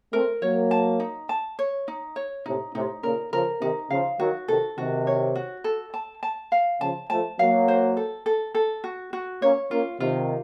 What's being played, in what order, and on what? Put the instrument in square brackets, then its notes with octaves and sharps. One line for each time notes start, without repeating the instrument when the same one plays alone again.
[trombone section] A3 C4 [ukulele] A#4
[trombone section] F#3 A#3 [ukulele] C#5
[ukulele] A5
D#4
A5
C#5
D#4
C#5
[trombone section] A2 C3 [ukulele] D#4
[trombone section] A2 C3 [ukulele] D#4
[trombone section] A#2 C#3 [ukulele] A#4
[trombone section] C#3 F3 [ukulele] A#4
[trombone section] C3 D#3 [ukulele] D#4
[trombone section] C#3 F3 [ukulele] F5
[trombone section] D#3 F#3 [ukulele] F#4
[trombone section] C3 D#3 [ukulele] A4
[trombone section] C3 D#3 [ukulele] F#4
[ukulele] C#5
F#4
A4
A5
A5
F5
[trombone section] C#3 F3 [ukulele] A5
[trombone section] F3 A3 [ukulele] A5
[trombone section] F#3 A#3 [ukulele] F5
[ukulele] C5
A4
A4
A4
F#4
F#4
[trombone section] A#3 C#4 [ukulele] C#5
[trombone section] A#3 C#4 [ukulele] F4
[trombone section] C3 D#3 [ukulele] F4